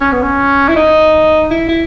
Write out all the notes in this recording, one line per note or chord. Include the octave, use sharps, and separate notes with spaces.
C#4
B3
C#4
E4
D#4
E4
E4